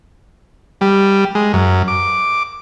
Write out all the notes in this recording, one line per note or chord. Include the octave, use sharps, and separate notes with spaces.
G3
G#3
F#2
D6